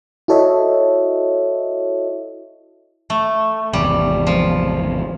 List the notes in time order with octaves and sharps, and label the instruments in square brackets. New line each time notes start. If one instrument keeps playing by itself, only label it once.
[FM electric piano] E4 F#4 A4 C#5 D#5 E5
[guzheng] A3
[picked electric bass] G#1 E2 C3 [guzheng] G3
[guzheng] F3